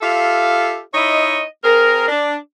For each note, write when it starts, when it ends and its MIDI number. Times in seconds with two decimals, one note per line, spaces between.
0.01 0.79 65
0.01 0.79 67
0.01 0.79 69
0.01 0.79 76
0.01 0.79 77
0.94 1.42 63
0.94 1.42 64
0.94 1.42 73
0.94 1.42 75
1.63 2.06 60
1.63 2.06 68
1.63 2.06 70
2.08 2.35 62